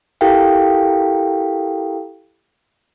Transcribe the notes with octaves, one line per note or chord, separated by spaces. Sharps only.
E4 G4 A4 A#4 F5 G5